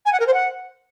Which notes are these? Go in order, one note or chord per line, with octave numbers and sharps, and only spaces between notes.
G#5
F#5
A#4
C5
F#5